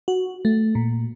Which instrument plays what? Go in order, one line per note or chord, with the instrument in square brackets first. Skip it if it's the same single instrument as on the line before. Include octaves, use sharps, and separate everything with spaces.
[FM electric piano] F#4
A3
A#2